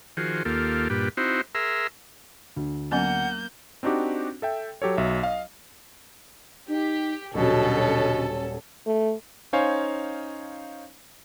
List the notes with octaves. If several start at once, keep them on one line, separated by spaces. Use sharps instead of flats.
D#3 F3 F#4 G#4 C5
D#2 A#3 F4 G4 A4
G2 A#2 G4 B4
C4 D#4 E4 F#4 C5
G#4 A#4 E5 A#5 C6 E6
D2
F#3 A#3 B3 C#4 F#5 G6
C4 D4 D#4 F#4 G4
A4 E5 G5
F#3 G4 A4 C#5
B1 F#3 E5
D#5 F5
D#4 G4
D#1 B2 D3 F#3 G3 C#4 A4
A3
C#4 D#4 C5 C#5 F5 G#5